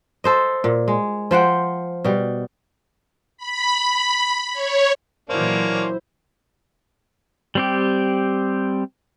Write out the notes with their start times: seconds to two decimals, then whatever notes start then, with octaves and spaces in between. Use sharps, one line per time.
0.24 A4 C5 D#5
0.64 A#2
0.88 G#3
1.31 F3 C5 F#5 G5
2.05 B2 G3
3.38 B5
4.53 C#5
5.30 A#2 E3 F#3 A#3 C#4 D4 E4 C5
7.55 G3 C4 G4